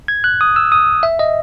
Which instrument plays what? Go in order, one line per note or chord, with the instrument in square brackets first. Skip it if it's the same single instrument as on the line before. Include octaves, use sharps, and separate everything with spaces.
[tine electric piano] G#6
F#6
D#6
E6
D#6
E5
D#5